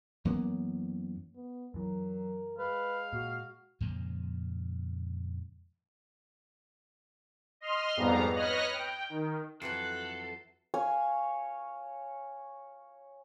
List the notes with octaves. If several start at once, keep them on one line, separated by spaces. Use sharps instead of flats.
F#2 E3 A#3 B3
B3
F#2 E3 F#3 A#4
G#3 B4 F5
A#2 F#4
F2 A#2 C#3 G#3
D#5 C6 F6
F2 G#2 G3 B3 F5 A#5
B4 C#5 D#5 F6 F#6 A#6
G5
D#3
F2 E3 F#3 A4 F#6 C7
C#5 F5 G#5